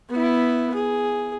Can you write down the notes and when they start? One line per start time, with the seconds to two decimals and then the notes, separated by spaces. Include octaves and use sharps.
0.10 B3 E4
0.75 G#4